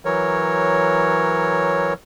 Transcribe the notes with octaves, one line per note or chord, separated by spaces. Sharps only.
E3 F#3 A#4 C#5